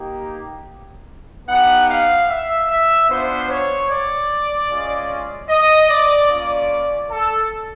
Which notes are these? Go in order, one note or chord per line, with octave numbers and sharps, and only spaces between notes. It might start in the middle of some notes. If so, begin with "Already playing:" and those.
Already playing: A#3 D#4 G4
B3 D#4 G4 F#5
F5
E5
E5
B3 D4 F4 C5
C#5
D5
G#3 C#4 F4
D#5
D5
A#3 C#4 F4 D5
A4